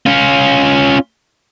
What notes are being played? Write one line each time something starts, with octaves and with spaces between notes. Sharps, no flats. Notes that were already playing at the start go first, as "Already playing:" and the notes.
C#4 F4